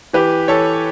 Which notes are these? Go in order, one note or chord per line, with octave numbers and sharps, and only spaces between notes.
E3 G4 B4
E3 A4 C#5